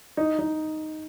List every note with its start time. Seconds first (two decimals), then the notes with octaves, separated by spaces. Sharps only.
0.17 D#4
0.39 D#4